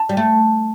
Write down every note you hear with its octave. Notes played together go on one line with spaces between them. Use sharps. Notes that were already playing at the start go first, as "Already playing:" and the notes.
Already playing: A5
G3
A3